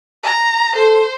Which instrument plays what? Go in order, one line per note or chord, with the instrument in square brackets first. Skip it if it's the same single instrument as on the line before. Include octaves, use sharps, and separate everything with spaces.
[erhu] A#5
[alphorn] A4 [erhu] C5